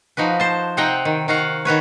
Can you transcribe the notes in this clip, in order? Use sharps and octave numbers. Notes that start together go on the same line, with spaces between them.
F3 D#4 F#4 B4
C5 A5
C3 C4 D#4 F#5 G5 A#5
D#3
D#3 F#4 F5 F#5
D#3 F#4 B4 C#5